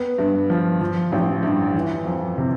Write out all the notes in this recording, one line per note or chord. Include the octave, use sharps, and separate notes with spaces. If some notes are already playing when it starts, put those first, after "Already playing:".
Already playing: B3
G2
F3
F3
A1
G2
E3
F2
C3